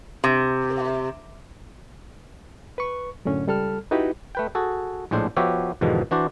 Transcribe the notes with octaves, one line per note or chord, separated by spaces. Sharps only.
C3
B4 C#6
F#2 A2 D3 C#4
C#2 G3 A4 A5 F6
D#4 E4 F#4 G4 B4
A3 B4 G5
F#4 G#4 A4
A#1 A2 G#3 D4 C5
F3 B3 F#4 G4 C#5 E5
E2 G#2 B2 D3 D#3 F3
E3 D4 F#4 C5 D5